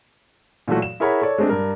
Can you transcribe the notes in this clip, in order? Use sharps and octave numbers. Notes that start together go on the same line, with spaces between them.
A#2 E3 F#3 A3 F#4
E7
E4 G#4 A#4 C#5 F#5 B5
A4 C#5 D5
G#3 A3 C4 D4 G4
G2 A#4